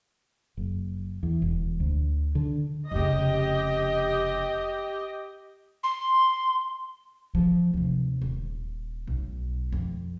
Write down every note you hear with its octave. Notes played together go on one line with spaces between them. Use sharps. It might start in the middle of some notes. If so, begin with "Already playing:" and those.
F#1
E2
E1
D2
D3
F1 C#3 G4 D#5
C6
F3
D#2 C3
D#1
B1
F2